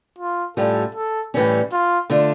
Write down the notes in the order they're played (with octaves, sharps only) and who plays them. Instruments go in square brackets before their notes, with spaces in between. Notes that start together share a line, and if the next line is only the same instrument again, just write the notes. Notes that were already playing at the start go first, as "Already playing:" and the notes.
[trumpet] F4
[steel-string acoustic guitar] A2 G3 C#4 F4 [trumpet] A4
[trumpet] A4
[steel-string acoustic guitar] A2 E3 G3 C#4
[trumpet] F4
[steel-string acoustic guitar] D3 A3 D4 F4